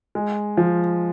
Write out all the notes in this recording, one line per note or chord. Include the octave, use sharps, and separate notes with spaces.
G#3
F3